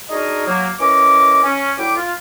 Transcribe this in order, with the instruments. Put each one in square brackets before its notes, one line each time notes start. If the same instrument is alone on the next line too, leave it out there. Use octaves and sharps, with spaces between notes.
[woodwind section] D4 D#4 F#4 G#4 A#4 D#5
F#3 A#3
E3 C#4 A#4 D#5 D6
C#4
D2 F#3 E4 G5 D6
F4